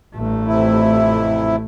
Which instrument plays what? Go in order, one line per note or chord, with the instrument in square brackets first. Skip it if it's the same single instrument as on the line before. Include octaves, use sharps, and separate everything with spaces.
[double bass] A1 A3 [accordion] G2
[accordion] F2 C3 E4